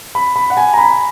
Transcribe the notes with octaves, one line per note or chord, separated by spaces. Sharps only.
B5
B5
F#5
G#5
A#5
B5